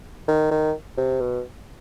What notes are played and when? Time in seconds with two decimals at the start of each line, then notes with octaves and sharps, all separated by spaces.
0.28 D#3
0.51 D#3
0.97 C3
1.21 B2